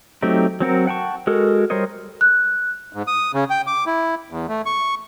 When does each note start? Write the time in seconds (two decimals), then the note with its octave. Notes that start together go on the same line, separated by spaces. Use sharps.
0.22 F#3 A3 C4 D#4 G4
0.60 F#3 C4 F#4 A#4
0.87 F#5 G5 A5 C#6
1.27 G#3 F#4 A4 A#4
1.70 G3 A#4 C5 C#5 D#5
2.21 F#6
2.93 G#2
3.07 D#6
3.34 C#3
3.50 G5
3.67 D6
3.87 E4
4.30 E2
4.48 A3
4.66 C#6